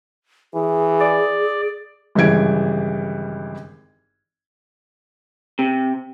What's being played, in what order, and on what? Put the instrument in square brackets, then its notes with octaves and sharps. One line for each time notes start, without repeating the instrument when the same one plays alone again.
[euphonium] E3 [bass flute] G#4
[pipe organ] D5
[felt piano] G#1 G2 C#3 E3 G#6 D7
[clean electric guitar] C3